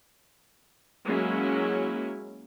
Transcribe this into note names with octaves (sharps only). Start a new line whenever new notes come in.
F#3 G#3 A#3 C#4 E4